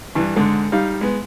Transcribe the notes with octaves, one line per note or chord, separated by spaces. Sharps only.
G2 E3
G#2 D3 G#3
G3 D#4 F5
G#3 B3